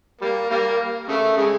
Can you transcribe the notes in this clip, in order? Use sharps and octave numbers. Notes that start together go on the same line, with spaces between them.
G3 A#3
G3 A#3
C#3 A3
C#3 G#3